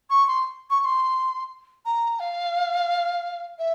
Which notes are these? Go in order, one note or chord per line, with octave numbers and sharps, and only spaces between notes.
C#6
C6
C#6
C#6
C6
A#5
F5
E5